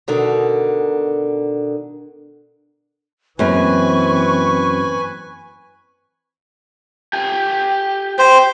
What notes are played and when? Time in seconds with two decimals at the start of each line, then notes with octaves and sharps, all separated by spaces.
0.08 B2 D3 D#3
3.39 F#2 E3 A#3 C4 B4 G#5 C#6
7.13 G4 G#5
8.19 G4 C5 G5